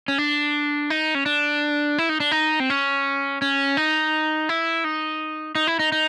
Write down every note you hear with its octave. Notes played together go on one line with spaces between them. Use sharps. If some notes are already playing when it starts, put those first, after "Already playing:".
C#4
D4
D#4
C#4
D4
E4
D#4
D4
D#4
C4
C#4
C#4
D#4
E4
D#4
D#4
E4
D#4
D#4